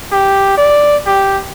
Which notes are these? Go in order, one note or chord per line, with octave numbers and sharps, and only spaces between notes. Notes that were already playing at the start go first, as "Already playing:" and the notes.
G4
D5
G4